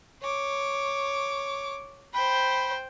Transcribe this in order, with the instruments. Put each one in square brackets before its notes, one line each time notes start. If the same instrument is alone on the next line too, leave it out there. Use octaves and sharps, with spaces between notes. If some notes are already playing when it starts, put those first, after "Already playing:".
[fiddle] C#5 D6
[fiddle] C5 G5 [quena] B5